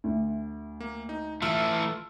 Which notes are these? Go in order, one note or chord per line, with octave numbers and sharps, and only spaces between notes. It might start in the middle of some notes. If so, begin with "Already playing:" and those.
D2
A#3
D#4
E3 A3 F4 E6 F6